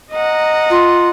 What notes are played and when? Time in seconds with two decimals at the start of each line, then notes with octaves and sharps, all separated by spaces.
0.12 D#5 F#5 A#5
0.70 F4